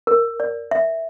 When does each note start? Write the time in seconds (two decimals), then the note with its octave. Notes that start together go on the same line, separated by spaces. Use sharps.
0.07 A#4
0.40 D5
0.71 E5